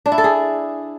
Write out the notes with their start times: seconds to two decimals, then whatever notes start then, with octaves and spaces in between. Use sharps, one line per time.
0.06 D4
0.12 E4
0.18 A4
0.24 G#4